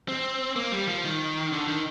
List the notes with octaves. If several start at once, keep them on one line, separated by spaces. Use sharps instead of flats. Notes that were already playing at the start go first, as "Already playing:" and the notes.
C4
A#3
G3
F3
D#3
D3
D#3